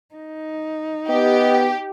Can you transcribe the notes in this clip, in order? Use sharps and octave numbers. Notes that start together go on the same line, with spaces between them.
D#4
B3 G4 D#5